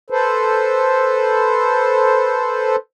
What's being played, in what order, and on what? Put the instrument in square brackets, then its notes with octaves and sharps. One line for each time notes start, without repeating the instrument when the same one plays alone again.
[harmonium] A4 B4 C5